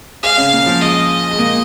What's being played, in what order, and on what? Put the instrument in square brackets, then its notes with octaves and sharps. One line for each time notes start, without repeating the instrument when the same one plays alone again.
[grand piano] G#3 G#4 [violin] F5
[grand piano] C#3 C#4
A#2 A#3
F3
[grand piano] G#3 [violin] D#5
[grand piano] G#3
A#2 A#3